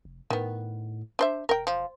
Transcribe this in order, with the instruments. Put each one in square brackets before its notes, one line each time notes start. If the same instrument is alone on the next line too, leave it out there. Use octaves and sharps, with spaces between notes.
[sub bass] F1
[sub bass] A2 [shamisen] D#3 B3
[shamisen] D4 C5 E5
[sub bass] E1 [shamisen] A#4 G5
[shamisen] F3